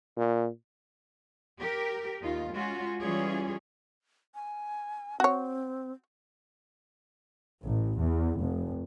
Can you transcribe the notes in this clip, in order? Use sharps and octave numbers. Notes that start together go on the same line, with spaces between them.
A#2
G4 A#4
D#2 D#4 F4
G#3 C#4 F4 F#4
E3 G3 C#4 F4 G#4 C#5
G#5
C4 F#4 C#5
A1
E2
F1